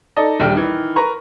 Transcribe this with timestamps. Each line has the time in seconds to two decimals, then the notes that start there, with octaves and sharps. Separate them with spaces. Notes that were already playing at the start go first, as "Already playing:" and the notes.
0.16 D#4 A4 D5 D#5
0.40 A#1 D#2 G3 G5 F6
0.54 D#3 E3
0.96 A#4 B4 A#5 C#6